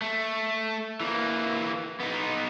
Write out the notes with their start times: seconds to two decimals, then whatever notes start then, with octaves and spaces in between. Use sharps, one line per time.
0.02 A3
1.00 E3 A#3
2.00 B3 D#4